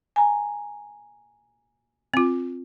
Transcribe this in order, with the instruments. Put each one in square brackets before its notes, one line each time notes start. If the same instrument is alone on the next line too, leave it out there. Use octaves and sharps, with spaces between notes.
[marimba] G#5 A#5
[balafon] C4 F4